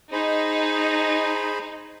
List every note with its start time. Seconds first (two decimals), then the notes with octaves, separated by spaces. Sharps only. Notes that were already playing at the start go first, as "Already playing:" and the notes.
0.12 D#4 G#4 C5 B5